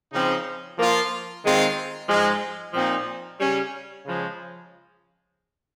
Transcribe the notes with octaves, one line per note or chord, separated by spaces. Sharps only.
C#3 F3 C4 D#4
F3 A#3 F4
D#3 G#3 C4 F4
G#2 F3 G#3
A#2 F3 C4 D#4
C#3 G3 C#4
C#3 F3 G#3